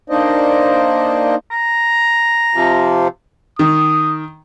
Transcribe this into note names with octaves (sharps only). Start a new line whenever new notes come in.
A#3 D4 D#4 C5 D5 D#5
A#5
C3 F3
D#3 D#6